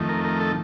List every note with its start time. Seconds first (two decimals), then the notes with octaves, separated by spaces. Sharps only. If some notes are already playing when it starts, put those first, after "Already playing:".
Already playing: F2 D#3 A3
0.09 A#4
0.24 A#4
0.40 A4